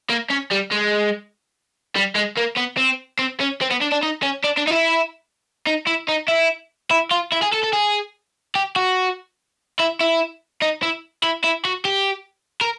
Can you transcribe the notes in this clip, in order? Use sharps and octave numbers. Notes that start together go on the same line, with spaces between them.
A#3
C#4
G3
G#3
G3
G#3
A#3
B3
C4
C4
C#4
C4
B3
D4
D4
D#4
C#4
D4
D4
D#4
E4
D#4
E4
D#4
E4
E4
F4
E4
G#4
A4
A4
G#4
G4
F#4
E4
E4
D#4
E4
E4
E4
F#4
G4
A#4